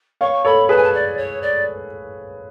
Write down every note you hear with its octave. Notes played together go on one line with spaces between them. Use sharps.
C#5 F5 C#6
A4 C#5 B5
G#4 B4 A5
G#5
A5
D5
C#5
D5